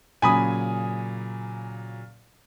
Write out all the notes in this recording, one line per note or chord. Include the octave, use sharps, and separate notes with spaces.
A#2 C#3 F#3 G#5 B5 D#6